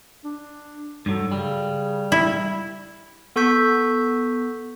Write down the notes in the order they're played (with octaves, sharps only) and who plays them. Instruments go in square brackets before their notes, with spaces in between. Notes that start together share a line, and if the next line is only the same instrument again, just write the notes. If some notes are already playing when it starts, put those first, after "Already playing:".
[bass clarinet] D4
[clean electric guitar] G2 F#3 [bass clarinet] A4
[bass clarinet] C#3 [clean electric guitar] G3
[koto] E4
[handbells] B3 A4 C#6 E6 G6 B6